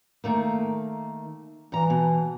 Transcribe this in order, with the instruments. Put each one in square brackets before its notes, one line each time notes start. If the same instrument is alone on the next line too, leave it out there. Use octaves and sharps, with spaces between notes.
[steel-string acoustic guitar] D#3 A3 A#3
[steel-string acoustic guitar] G2 A#5 [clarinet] E3
[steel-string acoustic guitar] B2